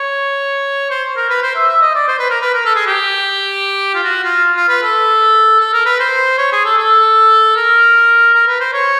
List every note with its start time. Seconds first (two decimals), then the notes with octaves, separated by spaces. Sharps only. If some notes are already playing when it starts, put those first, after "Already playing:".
Already playing: C#5
0.90 C5
1.16 A#4
1.30 B4
1.42 C5
1.56 E5
1.69 E5
1.81 D#5
1.95 D5
2.08 C5
2.19 B4
2.30 A#4
2.41 B4
2.54 A#4
2.65 A4
2.75 G#4
2.87 G4
3.95 F4
4.04 F#4
4.23 F4
4.56 F4
4.69 B4
4.82 A4
5.60 A4
5.73 A#4
5.86 B4
5.99 C5
6.38 C#5
6.52 G#4
6.65 A4
6.78 A4
7.56 A#4
8.34 A#4
8.47 B4
8.60 C5
8.73 C#5